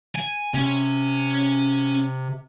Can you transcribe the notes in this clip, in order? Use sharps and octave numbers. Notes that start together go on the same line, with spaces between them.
G#5
C3 C#4